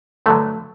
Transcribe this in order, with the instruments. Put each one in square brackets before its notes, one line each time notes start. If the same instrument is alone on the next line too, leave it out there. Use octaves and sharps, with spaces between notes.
[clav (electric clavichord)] G2 D3 F#3 A3